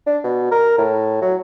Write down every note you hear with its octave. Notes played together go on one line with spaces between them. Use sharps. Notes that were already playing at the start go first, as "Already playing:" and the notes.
D4
B2
A#4
A2
F#3